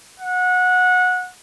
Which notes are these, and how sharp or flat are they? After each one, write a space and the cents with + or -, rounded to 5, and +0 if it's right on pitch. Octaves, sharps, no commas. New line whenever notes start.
F#5 -20